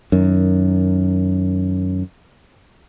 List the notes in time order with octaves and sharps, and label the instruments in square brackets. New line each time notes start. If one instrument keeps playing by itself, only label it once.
[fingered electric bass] F#2 D#3